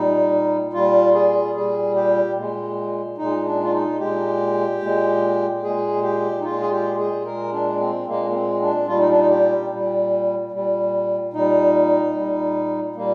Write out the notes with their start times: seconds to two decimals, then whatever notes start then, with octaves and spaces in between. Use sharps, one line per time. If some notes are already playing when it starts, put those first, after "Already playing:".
Already playing: A#2 G3 D#4
0.73 A#2 G3 F4
1.14 G#4
1.55 A#2 G3 G#4
1.95 G4
2.37 A#2 G#3
3.18 A#2 G#3 D#4
3.45 D4
3.64 F4
3.72 D#4
4.00 A#2 G#3 G4
4.81 A#2 G#3
5.62 A#2 G#3 G#4
6.03 G4
6.40 D#4
6.44 A#2 G#3 F4
6.61 G#4
6.71 G4
6.98 G#4
7.25 A#2 G#3 A#4
7.53 D4
7.80 C4
8.07 A#2 G#3 A#3
8.30 A#3
8.34 C4
8.62 D4
8.88 A#2 G3 F4
8.98 D#4
9.09 D4
9.19 D#4
9.30 G4
9.70 A#2 G3
10.51 A#2 G3
11.33 A#2 G3 D#4
12.15 A#2 G3
12.96 A#2 G3 A#3